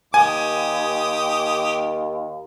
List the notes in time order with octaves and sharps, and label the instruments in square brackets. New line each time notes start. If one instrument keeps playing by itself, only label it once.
[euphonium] D#2 [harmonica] G4 D#6 [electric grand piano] G#5